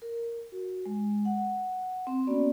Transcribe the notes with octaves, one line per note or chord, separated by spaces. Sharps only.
A#4
F#4
G#3
F#5
C4
A#3 B3 C#4 F#4 D5